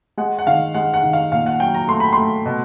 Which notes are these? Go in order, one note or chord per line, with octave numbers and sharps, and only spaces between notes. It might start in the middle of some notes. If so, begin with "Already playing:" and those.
G#3 F#5
F#5
D#3 F5
G#3 F#5
F#5
D#3
F5
A#2 F5
F#5
F#3 G5
A#5
A3 C6
B5
A3 C6
B2